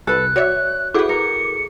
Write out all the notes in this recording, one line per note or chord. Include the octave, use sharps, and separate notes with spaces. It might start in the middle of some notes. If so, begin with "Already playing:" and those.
C2 A4 B4 F#6
F#4 C#5 D5 E5
E4 F#4 G#4 A4 B4 D6
A#4 C#7